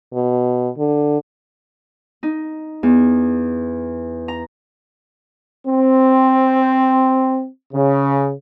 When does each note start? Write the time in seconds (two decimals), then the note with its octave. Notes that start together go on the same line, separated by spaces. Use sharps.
0.14 B2
0.78 D3
2.23 D#4
2.83 E2
4.28 A#5
5.67 C4
7.74 C#3